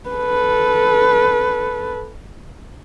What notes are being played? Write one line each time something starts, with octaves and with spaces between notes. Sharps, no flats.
A4 B4